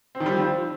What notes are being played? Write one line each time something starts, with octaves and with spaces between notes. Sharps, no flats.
C4
D#3
G3
F3
C4